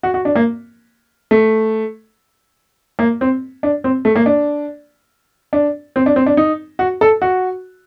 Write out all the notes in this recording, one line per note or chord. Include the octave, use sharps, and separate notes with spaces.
F#4
F#4
D4
A#3
A3
A#3
C4
D4
C4
A3
A#3
D4
D4
C4
D4
C4
D4
D#4
F#4
A4
F#4